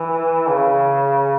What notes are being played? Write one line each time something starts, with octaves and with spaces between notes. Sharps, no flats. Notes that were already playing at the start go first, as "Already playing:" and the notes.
Already playing: E3
C#3